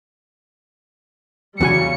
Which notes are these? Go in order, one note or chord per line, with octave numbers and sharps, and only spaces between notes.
E2 C#3 G3 F#4 G#5 C#7